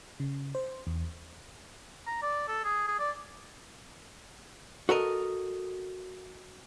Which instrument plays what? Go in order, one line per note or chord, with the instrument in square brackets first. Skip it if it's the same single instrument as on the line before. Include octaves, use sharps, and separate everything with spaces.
[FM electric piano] C#3
C5
E2
[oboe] A#5
D5
A4
G#4
G#4
D5
[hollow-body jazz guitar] F#4 A4 A#4 D#5